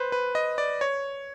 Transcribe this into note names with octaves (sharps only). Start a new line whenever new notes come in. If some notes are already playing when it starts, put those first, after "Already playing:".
Already playing: B4 C5
B4
D#5
D5
C#5